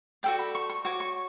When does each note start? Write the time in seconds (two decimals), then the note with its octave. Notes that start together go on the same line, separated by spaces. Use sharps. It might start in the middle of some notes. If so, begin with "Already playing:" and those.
0.23 F#4 A4 D5 G5
0.39 B5
0.55 C#6
0.70 C#6
0.85 F#4 C#5 D6
1.00 C#6